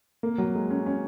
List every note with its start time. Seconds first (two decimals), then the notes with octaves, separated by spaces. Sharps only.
0.23 A#3
0.38 F#3
0.55 G#3
0.70 C#4
0.86 C#4